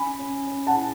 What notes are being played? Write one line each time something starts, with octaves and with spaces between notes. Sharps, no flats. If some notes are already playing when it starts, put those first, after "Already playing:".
Already playing: C#4 G#5 B5
C#4
C#4
F#5 A5
E4